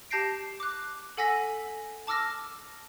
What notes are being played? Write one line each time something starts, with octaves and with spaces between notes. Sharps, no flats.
G4 A5 G6 A#6 C7 D7
D6 F#6
A4 F#5 G#5 E6 A#6 B6
A5 D6 E6 F6 A#6